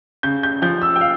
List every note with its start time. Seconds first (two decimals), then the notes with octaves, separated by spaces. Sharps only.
0.23 C#3 G6
0.43 G6
0.62 F3 G6
0.82 E6
0.96 G5
1.01 F5